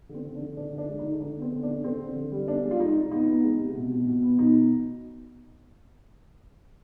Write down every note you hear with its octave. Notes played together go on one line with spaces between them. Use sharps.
D3 C4
D3
D4
D3
D3 D4
D3
D4
G#3
D#4
D3
D3 D4
B3 C4
D3
D4
D3
D3 C4
D3
D3
G3
B3 D4
G#3
F4
G#3 D#4
C3
B3 D#4
B3
G#3
C3
B2
B2
B2
B3
B2 D#4